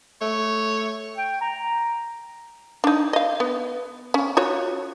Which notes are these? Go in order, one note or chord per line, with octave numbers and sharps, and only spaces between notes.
A3 C#5
G5
A#5
D4 D#4
D#5 F5
B3
C#4
F4 F#4 C#5